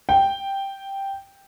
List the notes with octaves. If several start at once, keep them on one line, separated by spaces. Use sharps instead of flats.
G5